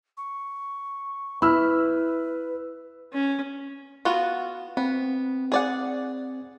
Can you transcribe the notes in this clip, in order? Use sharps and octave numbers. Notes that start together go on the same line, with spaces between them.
C#6
E4 B4 B5 E6 F6
C#4
B3 F4 F#4
B3 C4
G#4 D5 F#5